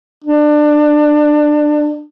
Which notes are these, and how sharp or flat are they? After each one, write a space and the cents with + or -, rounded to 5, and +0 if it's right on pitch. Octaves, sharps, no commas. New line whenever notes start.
D4 +20